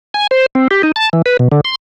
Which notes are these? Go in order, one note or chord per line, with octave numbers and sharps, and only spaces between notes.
G#5
C5
C4
G4
D#4
A5
E3
B4
B2
D3
C6